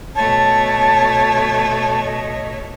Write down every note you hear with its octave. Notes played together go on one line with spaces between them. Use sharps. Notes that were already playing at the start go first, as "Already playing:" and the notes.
B2 A3 C#5 A5
D#5